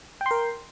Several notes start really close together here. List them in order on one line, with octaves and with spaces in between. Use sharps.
G5 C6 A#4